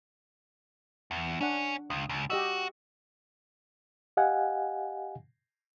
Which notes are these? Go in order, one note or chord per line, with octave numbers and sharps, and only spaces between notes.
E2
C#4 D4 F#5
C#2 D#6
C#2
F#4 G4 D#5 E6
G4 D#5 F5 F#5 G#5